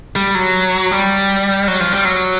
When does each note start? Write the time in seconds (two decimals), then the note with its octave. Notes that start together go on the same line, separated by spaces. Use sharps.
0.16 G3
0.35 F#3
0.91 G3
1.68 F#3
1.80 F3
1.93 G3
2.05 F#3